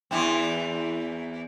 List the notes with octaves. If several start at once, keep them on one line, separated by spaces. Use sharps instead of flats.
E2 E3 C4